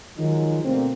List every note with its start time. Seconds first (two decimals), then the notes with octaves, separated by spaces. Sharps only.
0.17 D#3 F3 F#3 G#3 D#4
0.64 D2 B2 D3 A#3 C4